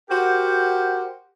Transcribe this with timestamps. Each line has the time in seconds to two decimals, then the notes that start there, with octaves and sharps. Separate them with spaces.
0.10 F#4 G4 A#4 C5 F#5